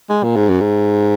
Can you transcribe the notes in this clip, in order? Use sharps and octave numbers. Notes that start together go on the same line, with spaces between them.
G#3
A#2
G#2
F#2
G#2